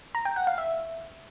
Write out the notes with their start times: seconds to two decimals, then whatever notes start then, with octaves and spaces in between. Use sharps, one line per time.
0.15 A#5
0.25 G5
0.36 F#5
0.47 F5
0.58 E5